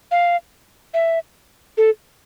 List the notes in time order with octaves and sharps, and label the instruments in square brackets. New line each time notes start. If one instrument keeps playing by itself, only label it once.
[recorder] F5
E5
A4